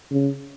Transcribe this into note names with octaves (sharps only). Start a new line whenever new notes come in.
C#3